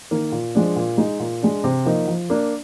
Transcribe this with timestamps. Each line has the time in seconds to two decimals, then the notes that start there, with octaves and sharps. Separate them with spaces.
0.11 D#3 A#3
0.32 A#2
0.55 F3 G#3 D4
0.76 A#2
0.98 G#3 D#4
1.20 A#2
1.42 G#3 D4
1.64 C3
1.85 F3 A#3 D#4
2.07 F3
2.30 A#3 D4